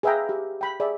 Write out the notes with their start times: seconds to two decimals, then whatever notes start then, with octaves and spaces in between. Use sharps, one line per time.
0.03 G#4 B4 E5 F5 G5 A#5
0.29 G4
0.61 G5 B5
0.80 G#4 D5 E5 B5